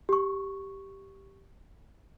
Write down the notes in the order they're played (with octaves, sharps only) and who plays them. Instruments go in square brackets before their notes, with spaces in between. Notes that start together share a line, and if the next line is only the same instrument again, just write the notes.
[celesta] G4 C#6